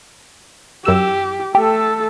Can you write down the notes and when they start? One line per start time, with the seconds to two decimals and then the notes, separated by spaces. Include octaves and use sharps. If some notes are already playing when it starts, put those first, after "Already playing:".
0.85 F#2 G4 E6
1.55 A3 G4 A4